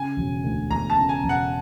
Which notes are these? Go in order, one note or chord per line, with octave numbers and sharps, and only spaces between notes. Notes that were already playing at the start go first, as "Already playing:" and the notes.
Already playing: C#3 G#5
E1
D2
E1 A#5
A5
C#3
G#5
E1
F#5